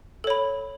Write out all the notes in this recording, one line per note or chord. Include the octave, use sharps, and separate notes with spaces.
A4 C#5 B5